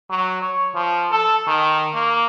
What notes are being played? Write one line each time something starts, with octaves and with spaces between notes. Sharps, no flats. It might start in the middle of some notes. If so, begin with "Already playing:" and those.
F#3
C#5
F3
A4
D#3
A#3